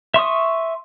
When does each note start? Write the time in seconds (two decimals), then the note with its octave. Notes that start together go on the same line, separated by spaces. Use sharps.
0.14 E5 C6 C#6 D#6